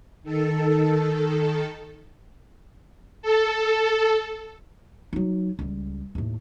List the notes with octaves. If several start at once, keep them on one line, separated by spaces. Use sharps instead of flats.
D#3 A4
A4
F#3 D#4
C#2 G3
D#2 A2